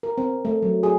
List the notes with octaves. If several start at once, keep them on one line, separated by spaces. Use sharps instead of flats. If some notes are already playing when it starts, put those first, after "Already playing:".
A#4
C4
A3
F#3
G#4